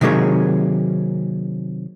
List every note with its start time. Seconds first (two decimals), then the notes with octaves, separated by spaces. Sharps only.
0.01 C3 D#3 F#3 A#3 G#4 C#5